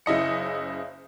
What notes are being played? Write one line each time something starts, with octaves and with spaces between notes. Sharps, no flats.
F#1 C#3 E4 D#5 C#7